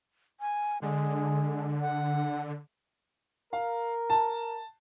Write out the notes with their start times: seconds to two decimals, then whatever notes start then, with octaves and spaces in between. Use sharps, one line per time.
0.40 G#5
0.82 D3 G#3
1.81 F#5
3.53 A#4 F5
4.10 A5